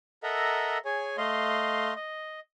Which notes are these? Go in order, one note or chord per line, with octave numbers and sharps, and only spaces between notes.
A4 A#4 D#5 E5 F#5 A#5
G#4 C#5 G#5
A3 D#5 F5 C6
D#5